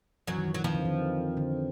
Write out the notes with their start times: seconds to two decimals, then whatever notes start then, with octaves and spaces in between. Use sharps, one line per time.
0.27 F#2 E3 F#3
0.38 D#3
0.48 E3
0.54 F#3
0.64 F2 D#3 F3
0.75 D3
0.85 D#3
1.37 D3